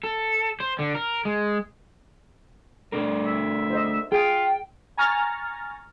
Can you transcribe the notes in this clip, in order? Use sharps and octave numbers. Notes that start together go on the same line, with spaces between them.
A4
C5
D3
A#4
G#3
A3 D4 A#4
E5
C5 D#5
F4 G#4 G5
G#5 A#5 C#6 F6 A6 A#6